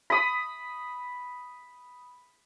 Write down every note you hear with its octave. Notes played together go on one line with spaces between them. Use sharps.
B5 D#6